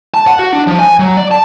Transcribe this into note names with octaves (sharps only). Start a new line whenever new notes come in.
A5
F#5
F#4
D4
F3
G#5
F#3
D5
A5